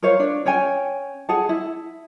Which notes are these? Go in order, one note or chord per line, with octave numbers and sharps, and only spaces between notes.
A#4 C5 C#5 F5
D4
C#4 C#5 G5 G#5
G#4 F#5 A5
E4